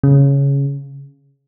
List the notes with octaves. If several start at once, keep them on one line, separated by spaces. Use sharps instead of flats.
C#3